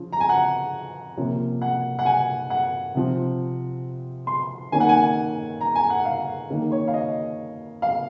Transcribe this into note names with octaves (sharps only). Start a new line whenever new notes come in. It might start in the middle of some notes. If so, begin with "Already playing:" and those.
Already playing: C#3 F3
A#5
G#5
F#5
C3 F3 A#3 C#4
F#5
F#5
G#5
F#5
C3 F3 C4
C6
D#3 A#3 C#4 G#5
F#5
G#5
A#5
G#5
F#5
F5
D#3 A#3 C#4
C#5
F5
D#5
F5